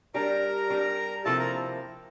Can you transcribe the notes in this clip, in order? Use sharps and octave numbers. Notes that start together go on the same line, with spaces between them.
G3 D4 G4 A#4 A#5
G3 D4 G4
C3 F3 A#3 E4 A4 A5
A#4 A#5